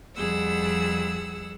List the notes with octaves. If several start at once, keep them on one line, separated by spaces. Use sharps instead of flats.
F2 G3 G#4 F#5 E6